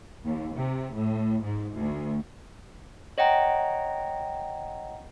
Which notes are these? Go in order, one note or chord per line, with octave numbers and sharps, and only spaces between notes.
D#2
C3
A2
G#2
D2
C#5 D#5 F#5 G5 A#5